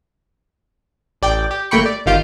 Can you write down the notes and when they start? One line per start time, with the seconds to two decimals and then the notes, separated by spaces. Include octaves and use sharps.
1.22 A1 D5 G5
1.51 G4
1.71 G1 A3 A#3 G5 B5 C#6
1.86 D5
2.06 G1 D#3 F4 G4 F5 D7